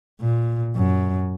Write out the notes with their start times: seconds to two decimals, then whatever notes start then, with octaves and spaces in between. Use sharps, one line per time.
0.21 A#2
0.76 F#2